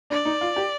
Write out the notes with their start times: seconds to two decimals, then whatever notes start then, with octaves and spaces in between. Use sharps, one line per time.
0.10 D4 D5
0.25 D#4
0.41 F4
0.56 G4